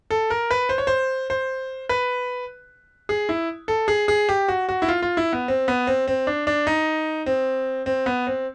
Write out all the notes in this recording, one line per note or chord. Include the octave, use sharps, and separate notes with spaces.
A4
A#4
B4
C5
C#5
C5
C5
B4
G#4
E4
A4
G#4
G#4
G4
F#4
F#4
E4
F4
F4
E4
B3
C4
B3
C4
C4
D4
D4
D#4
C4
C4
B3
C4